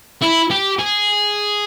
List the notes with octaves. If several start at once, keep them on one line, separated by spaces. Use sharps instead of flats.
E4
G4
G#4